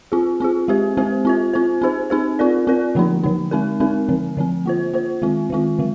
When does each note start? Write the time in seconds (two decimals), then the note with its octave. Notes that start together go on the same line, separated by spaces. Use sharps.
0.12 C4 F4 G#4
0.40 C4 F4 G#4
0.68 G#3 C4 G4 C5
0.97 G#3 C4 G4 C5
1.25 C4 F4 C5
1.54 C4 F4 C5
1.82 C4 D#4 G#4 C5
2.10 C4 D#4 G#4 C5
2.39 C4 F4 A#4 D5
2.67 C4 F4 A#4 D5
2.95 D3 F3 A#3 D#4
3.23 D3 F3 A#3 D#4
3.51 G#3 C4 D#4 A#4
3.80 G#3 C4 D#4 A#4
4.09 D3 F3 C4
4.37 D3 F3 C4
4.66 A#3 F4 C5
4.93 A#3 F4 C5
5.22 D#3 G#3 C4 F4
5.50 D#3 G#3 C4 F4
5.79 D3 G#3